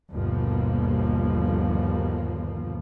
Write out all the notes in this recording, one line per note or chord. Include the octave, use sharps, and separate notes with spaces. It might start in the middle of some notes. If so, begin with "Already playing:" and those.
G1 D#2 B2 F3 A#3